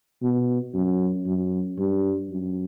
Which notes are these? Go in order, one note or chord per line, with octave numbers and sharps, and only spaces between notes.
B2
F#2
F#2
G2
F#2